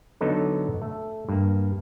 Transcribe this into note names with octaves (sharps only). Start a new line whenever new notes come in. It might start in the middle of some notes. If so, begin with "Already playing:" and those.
D3 F#3 B3 D#4 A4
A3
G2 A#3